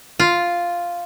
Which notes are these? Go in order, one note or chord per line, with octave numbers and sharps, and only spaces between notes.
F4